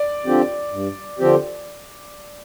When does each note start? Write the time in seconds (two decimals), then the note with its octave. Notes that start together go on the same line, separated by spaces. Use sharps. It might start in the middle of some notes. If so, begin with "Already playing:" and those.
Already playing: D5
0.25 D3 F3 C4 G4
0.72 G2
1.19 D3 F3 C4 G4